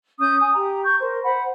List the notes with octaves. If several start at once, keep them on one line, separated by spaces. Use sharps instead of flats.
C#4 D#6 G6
G#5 D#6
G4 A#5
C#6 G6
A#4 C5
C5 F#5 B5